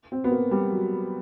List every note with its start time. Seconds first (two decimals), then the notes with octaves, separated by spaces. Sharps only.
0.12 C4
0.24 B3
0.32 A#3
0.51 G3
0.71 F#3